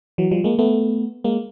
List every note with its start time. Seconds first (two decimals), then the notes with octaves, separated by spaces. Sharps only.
0.18 E3 F#3
0.31 F3 G3
0.44 G#3 A#3
0.59 A3 B3
1.24 G#3 A#3